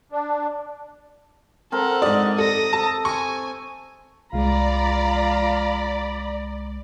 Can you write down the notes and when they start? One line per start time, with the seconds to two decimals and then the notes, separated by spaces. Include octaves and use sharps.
0.12 D4
1.72 C4 A4 A#4 F#5
2.02 G#2 D5 D#5
2.38 A4 D#6 A#6
2.73 A4 A5
3.05 G#5 C#6
4.33 C2 G#3 F4 D5 A#5 B5